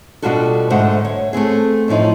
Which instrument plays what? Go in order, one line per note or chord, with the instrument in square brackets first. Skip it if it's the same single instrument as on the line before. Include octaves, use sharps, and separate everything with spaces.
[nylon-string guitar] B2 G3 D4 F4 F#4 A4
G#2 D3 A3 C5 F#5
C#5
A3 B3 C4 G#4
F#2 A2 F3 D#4